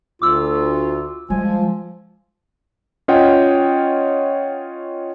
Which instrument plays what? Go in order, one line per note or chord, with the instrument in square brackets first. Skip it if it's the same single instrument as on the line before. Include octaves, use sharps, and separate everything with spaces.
[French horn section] D2 [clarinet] F4 [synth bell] D6 E6
[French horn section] F3 [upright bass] G3 G#3 [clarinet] G#5
[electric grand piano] C#4 F4 C#5 D#5 F#5 G5